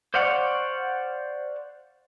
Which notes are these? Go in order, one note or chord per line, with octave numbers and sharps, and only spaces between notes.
C5 D5 F5 F#5 C#6